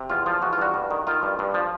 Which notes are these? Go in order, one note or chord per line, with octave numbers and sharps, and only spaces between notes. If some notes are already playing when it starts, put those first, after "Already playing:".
Already playing: C3
E2 F4
F3 F4
E2 F#4
F4
G2 F#4
G2
D#3
D#3 F4
G2
G2
F3